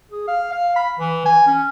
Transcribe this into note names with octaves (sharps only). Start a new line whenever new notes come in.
G#4
F5
F5
B5
E3
G#5
C#4